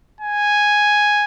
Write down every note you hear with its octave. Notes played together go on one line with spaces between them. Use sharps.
G#5